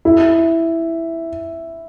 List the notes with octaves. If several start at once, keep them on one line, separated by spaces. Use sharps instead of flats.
E4